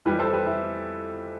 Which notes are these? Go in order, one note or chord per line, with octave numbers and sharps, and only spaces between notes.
F2 E3 G3 G4 B4
A4 C5
G4 B4
E4 G4